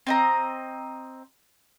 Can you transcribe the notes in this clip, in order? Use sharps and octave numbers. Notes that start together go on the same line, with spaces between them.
C4 D#5 A#5